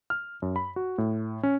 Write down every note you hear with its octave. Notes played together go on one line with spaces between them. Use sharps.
F6
F#2
B5
F#4
A2
C#4